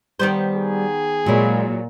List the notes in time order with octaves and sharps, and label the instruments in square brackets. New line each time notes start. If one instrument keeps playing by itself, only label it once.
[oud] D#3 B3 C5 [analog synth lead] G3
[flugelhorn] G#4
[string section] A#2 [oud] F#3 E4 [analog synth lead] G#3